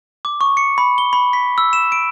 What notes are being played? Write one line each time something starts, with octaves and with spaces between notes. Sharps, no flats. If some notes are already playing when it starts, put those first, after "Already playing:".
D6
C#6
C#7
B5
G7
B5
B6
E6
E7
D7